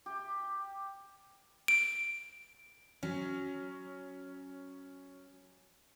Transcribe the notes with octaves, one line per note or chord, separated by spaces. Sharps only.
G4
D7
F#3 C#4